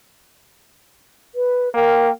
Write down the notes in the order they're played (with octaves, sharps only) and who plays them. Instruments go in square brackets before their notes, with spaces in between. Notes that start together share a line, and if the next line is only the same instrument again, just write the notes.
[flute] B4
[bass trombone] A#3 [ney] A#4 [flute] G5